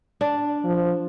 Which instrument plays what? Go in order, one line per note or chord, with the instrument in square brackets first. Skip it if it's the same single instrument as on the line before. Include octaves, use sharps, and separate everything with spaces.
[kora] D4
[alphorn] F3